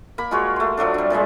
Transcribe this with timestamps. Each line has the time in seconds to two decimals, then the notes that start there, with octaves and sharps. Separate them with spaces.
0.18 A#3 B5
0.31 G#3 F4 F#4 C#5
0.56 A3 C6
0.77 F3 F#3 A3 D4
0.94 G3 D4
1.10 A#2 F3 G3 G#3